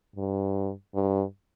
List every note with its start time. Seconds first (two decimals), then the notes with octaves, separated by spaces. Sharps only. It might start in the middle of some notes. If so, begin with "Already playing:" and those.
0.16 G2
0.95 G2